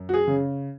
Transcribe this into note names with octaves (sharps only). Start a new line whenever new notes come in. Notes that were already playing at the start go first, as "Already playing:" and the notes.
Already playing: F#2
F#4
G#4
C#3